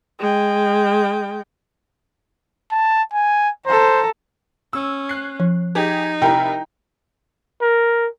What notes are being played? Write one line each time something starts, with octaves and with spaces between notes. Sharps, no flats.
G#3 G5
A5
G#5
A4 C5 A#5
C#4 E6
F#6 C7
F3
D#4 G4 G#4
C3 E4 A#4 G5 A#5
A#4